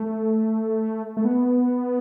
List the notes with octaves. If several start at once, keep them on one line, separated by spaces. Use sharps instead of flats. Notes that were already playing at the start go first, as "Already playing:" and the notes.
Already playing: A3
A3
B3